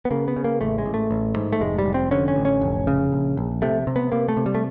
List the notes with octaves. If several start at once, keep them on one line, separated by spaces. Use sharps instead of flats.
B3
C#3 A#3
B3
C#3
A#3
A1 A3
G#3
A1
A3
A1
G#2
A3
F1 G#3
G3
F1
C4
D3 C#4
C#4
A1
C#4
F1
C#3
A#1
A#1
C3 A3
C3
B3
C3 A#3
A3
C3
G3
A3